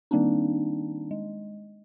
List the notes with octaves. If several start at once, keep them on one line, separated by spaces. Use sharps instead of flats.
D#3 G3 A#3 C4 D4 D#4
G#3